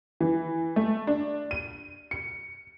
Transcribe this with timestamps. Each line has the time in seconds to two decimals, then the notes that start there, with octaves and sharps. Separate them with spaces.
0.20 E3
0.76 A3
1.07 D4
1.51 D#7
2.11 C#7